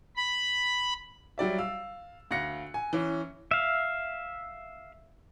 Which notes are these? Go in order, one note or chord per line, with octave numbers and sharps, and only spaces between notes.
B5
F#3 G3 D5 E5
F5 E6
D2 F5 F#6 A#6 C#7
G#5
E3 C#4
E5 F5